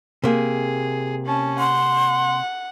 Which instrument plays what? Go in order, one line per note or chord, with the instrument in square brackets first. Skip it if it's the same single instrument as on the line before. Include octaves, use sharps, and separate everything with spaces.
[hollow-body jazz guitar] C3 A#3 [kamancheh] G#4
[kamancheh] C#4 A5
[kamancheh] F#5 [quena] C6